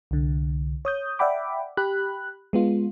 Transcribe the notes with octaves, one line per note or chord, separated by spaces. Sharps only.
C2 D3
C#5 D#6 G6
D5 E5 F#5 G5 B5 D6
G4 B5 F#6
G#3 B3 F4